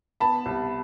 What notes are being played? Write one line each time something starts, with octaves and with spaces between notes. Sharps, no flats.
B3 A5 B5
C2